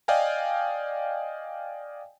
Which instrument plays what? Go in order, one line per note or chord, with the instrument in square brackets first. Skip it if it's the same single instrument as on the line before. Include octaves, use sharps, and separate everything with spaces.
[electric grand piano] D5 D#5 F5 G5 G#5